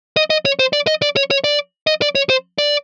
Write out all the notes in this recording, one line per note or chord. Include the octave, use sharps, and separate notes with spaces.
D#5
D#5
C#5
C5
D5
D#5
D5
C#5
C#5
D5
D#5
D5
C#5
C5
D5